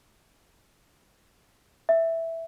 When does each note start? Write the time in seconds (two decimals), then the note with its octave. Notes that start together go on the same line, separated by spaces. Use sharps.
1.89 E5